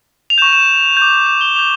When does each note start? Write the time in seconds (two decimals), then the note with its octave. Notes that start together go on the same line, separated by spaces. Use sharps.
0.30 F7
0.38 C#6 G6 E7
0.53 E7
0.97 D6 G6
1.26 F7
1.41 G7
1.56 D6 G6 F7